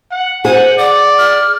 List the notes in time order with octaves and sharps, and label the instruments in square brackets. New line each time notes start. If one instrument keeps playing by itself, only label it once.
[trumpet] F#5
[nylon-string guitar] G#4 [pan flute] C5 [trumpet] F#5
[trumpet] D5 [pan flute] F#5
[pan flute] F6